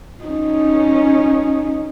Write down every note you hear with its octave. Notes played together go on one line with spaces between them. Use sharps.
C#4 D#4